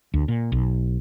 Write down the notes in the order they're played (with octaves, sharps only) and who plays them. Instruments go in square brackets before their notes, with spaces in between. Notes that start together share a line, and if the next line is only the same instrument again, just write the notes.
[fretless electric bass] D2
A#2
B1